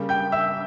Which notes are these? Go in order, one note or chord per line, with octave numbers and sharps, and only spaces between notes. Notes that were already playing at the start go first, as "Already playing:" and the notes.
Already playing: C#3 G3 A#3
G5 G6
E5 E6